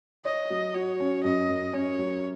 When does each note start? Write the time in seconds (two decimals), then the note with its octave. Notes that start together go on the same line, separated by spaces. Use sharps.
0.25 C#5 D#5
0.50 F#3
0.74 F#4 C#5
1.00 C#4
1.23 F#2 D#5
1.49 F#2
1.73 C#4 C#5
1.99 F#3